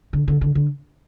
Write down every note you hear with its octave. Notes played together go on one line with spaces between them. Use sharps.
D3
D3
D3
D3